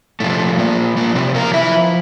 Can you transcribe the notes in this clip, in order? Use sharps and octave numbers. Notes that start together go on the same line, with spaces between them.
A#2 F3 A3
A#2 A#3
A#2 A#3
C3 C4
A#3 A#4
E4 E5